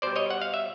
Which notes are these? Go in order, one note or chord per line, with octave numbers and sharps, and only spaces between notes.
B2 G3 C5 D5
C#5 D#5
F#5
F5
E5